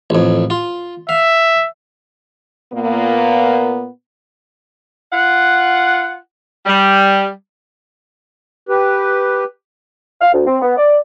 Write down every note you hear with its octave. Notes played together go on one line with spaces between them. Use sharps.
A1 F2
F4
E5 F5
A#2 A#3 B3
F4 F#5
G3
G4 B4
F5
D2
C4
B3
D5